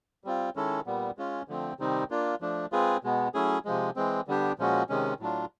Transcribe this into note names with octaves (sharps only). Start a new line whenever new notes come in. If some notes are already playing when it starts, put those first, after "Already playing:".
G3 C4 F4
D#3 G#3 C#4 E4 A4
A#2 G3 B3
G#3 C#4 F4
D3 F3 A3 C4
C3 D#3 G3 C4 D#4
A#3 D4 F4
F3 A3 D4
G#3 C4 F4 G#4 B4
B2 G#3 B3
F#3 A3 C#4 E4 G#4
C3 F3 G#3
E3 G#3 C4
D3 G3 B3 D4 G4
A#2 F3 G#3 C#4 F#4
C3 D#3 G#3 C#4
A2 F#3 A3 D4 F4